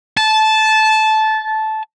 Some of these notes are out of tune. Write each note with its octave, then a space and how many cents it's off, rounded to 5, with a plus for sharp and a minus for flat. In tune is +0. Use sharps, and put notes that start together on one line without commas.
A5 -15